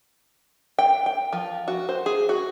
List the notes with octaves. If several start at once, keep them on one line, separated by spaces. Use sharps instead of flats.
G5
G5
F3
F#4
C5
G#4
F#4